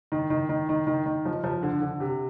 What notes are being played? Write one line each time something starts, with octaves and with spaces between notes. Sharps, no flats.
D#3
D#3
D#3
D#3
D#3
D#3
F3
F3
D3
D3
C3